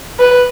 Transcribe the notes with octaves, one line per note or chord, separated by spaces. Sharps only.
B4